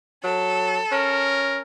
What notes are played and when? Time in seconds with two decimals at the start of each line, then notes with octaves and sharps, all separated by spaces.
0.24 F#3 A4
0.92 C#4 A#4